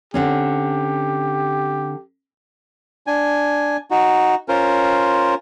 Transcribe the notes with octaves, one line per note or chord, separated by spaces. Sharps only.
D3 C4 C#4 G4
D4 G#5
D#4 F#4
C#4 F4 A#4 C5